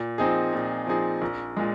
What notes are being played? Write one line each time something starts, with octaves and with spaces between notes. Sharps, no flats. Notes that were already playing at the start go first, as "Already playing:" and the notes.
Already playing: A#2
F3 C4 D#4 G#4
A#2
F3 C4 D#4 G#4
A#1
A#2 G#3